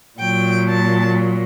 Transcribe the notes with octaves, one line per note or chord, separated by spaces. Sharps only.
A#2 F#3 G5
A5